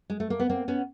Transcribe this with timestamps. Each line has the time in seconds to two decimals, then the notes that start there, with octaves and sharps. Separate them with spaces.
0.10 G#3
0.20 A3
0.30 A#3
0.40 B3
0.49 A#3 C4
0.68 B3 C#4